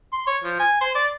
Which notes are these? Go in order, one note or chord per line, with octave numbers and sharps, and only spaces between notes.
C6
C#5
F3
G#5
C5
D5